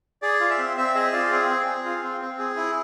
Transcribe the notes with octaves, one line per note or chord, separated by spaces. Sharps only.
G#4 D5
F4
E5
C4
C4 E5
G#4 D#5
F4 D5
C4 G#4
C4
G#4
F4
C4
C4
G#4
E4